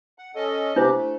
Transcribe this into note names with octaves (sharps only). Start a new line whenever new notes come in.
F#5
C#4 A4 D#5
C3 D4 E4 G4 C5
A3